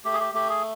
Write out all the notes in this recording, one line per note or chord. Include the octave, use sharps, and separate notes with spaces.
A3 G4
G#4
G4
A3 G4
G#4